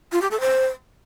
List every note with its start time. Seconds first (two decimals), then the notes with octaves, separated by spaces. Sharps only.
0.12 F4
0.22 G4
0.31 A4
0.40 C5